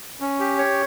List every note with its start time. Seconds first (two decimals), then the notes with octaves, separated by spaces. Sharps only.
0.20 C#4
0.40 G4
0.58 C#5